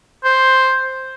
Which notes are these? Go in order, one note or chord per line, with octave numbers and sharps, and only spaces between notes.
C5